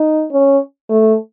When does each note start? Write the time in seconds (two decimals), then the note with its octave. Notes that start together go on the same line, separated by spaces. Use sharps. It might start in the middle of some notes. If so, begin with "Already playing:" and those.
Already playing: D#4
0.32 C#4
0.89 A3